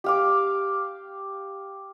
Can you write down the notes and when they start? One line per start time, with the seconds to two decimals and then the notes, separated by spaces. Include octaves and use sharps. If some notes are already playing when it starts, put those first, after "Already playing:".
0.04 G4 F5 D6